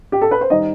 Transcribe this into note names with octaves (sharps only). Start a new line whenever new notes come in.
G4
A4
B4
C5
D#3 G3 D#4 D#5